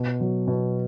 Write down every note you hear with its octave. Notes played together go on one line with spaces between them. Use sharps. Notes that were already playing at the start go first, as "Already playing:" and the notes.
Already playing: B2
F#3
B2